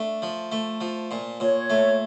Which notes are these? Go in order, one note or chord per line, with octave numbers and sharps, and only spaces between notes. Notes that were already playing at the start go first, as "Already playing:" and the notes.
Already playing: A3 D4
F3
A3
F3
A#2
A#2 C#5
A3